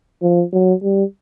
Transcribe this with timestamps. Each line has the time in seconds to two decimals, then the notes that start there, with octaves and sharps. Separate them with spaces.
0.22 F3
0.53 F#3
0.83 G3